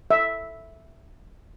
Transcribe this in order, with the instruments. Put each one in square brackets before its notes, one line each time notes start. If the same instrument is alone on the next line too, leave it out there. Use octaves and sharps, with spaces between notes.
[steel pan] E5